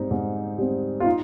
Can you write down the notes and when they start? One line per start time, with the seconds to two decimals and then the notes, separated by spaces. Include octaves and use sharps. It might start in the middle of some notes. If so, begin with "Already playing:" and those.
Already playing: G#2 G3 C4 D#4
0.11 G#2
0.58 G3 C4
1.00 F4
1.05 D#4